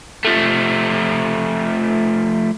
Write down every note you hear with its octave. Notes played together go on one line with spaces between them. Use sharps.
F3 A3